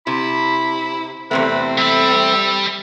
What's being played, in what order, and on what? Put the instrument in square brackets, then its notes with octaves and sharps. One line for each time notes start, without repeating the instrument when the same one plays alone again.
[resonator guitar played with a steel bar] C3 [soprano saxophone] E4 [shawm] B5
[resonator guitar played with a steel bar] E2 C3 A3 [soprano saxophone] C4 [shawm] B4
[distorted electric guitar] G3 B5 [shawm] E5